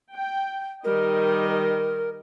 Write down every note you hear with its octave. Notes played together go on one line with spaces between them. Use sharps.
G5
D#3 G3 A#4 D#5